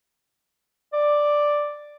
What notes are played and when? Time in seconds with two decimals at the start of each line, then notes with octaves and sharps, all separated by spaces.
0.93 D5